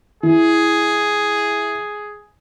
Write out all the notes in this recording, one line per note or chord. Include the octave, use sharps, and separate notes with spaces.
E3 G#4